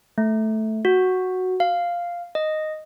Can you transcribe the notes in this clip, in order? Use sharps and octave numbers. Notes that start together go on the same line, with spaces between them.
A3
F#4
F5
D#5